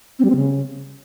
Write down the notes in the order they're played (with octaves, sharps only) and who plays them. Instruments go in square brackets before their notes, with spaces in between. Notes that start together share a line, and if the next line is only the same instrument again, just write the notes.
[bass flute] C4
G3
C4
C#3